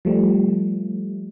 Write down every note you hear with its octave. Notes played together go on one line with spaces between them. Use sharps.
F3 G3 A3